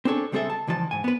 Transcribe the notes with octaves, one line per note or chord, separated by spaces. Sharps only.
C4 D4 G#4 A4 C#5
C#2 G3 C4 G#4 A4 E5
A5
C#2 E3 F3 D5 A5
G#2 G#5
B3 B4